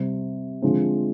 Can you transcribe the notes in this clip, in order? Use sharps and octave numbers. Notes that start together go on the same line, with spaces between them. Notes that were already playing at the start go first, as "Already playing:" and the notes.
Already playing: C3 G3 C4
D3 F3 G#3 C4